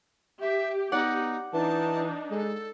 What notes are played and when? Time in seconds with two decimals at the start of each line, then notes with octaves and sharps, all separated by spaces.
0.41 G4 E5
0.92 B3 D#4 D5 F#5
1.54 E3 D4 D#4 A5
2.31 G#3 A4